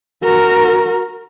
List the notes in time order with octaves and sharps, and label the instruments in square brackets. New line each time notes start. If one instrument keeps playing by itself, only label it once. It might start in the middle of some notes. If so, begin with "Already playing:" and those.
[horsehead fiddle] F#4 A#4